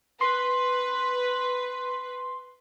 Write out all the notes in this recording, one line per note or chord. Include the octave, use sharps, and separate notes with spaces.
B4 C6